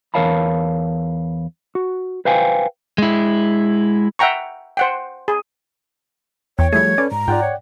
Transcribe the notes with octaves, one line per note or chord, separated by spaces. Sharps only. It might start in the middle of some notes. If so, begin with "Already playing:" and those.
E2 A#4 C#5 F5 A5 B5
F#4
B4 C5 F5 G5 G#5
G#3 E4
E5 F#5 G5 A#5 C#6
C5 F#5 G5
G#4
E2 C#5 G5
F3 G3 A3 E4 G#4 G#6
C#4 A4 B4 D5
G#2 A#5
G#2 F4 D5 F#5 G5
C#5